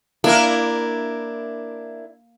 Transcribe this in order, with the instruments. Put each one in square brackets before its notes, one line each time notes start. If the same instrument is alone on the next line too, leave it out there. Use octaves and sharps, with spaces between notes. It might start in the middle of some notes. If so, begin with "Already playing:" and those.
[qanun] A#3 [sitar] D4 E4 A#4